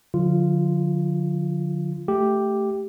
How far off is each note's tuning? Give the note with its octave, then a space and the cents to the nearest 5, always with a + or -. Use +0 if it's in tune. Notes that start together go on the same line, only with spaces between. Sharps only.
D3 +0 F3 +45 F4 -10
A3 +0 G4 +0